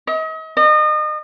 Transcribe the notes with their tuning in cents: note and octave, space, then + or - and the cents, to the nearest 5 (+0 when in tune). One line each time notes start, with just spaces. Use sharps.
D#5 +40
D#5 -35